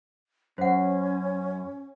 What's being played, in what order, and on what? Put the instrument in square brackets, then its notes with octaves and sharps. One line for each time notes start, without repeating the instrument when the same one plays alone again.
[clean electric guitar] F#2 [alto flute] C#4 [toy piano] C5 F#5